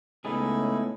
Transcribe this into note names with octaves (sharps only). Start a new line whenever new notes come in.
C#2 A2 B3 D#4 E4 G#4